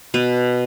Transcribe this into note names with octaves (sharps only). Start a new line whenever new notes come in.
B2 B4